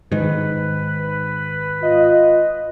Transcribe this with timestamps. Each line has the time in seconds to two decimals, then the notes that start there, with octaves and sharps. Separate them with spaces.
0.12 G#2 D#3 B4
1.82 F4 D#5